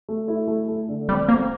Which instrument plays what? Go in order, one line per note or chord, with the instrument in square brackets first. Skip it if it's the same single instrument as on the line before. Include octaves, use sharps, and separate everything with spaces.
[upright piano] A3
E4
A3
A3
D3
[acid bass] G3 [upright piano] C4
[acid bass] A#3 [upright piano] C4